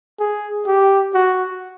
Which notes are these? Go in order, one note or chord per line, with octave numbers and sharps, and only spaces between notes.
G#4
G4
F#4